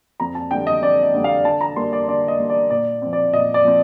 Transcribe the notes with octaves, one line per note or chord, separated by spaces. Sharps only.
F2 A#5
A5
D3 G3 G5
D#5
F2 D5
D#5
D3 G3
F5
D3 A5
A#5
G3 A#3 C6
D5
D3 D5
D#5
G3 A#3
D5
A#2 D5
F3 C4
D5
A#2 D#5
D5
F3 C4